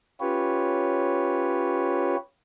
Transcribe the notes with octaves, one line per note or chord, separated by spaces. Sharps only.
C#4 F4 G4 B4 C#5